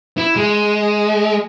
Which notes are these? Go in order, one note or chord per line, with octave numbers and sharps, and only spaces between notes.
E4
G#3